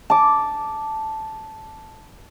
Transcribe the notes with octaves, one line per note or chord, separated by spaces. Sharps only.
A5 D6